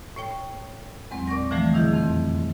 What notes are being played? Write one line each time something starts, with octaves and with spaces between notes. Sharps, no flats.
A2 C#5 G5
E2 F#3 G#3 C4
A#2 D5 C#6 A#6
D3 E3 F3 G3 A3
B2 D#3 E4 G#4 G6
F2 D#3 C4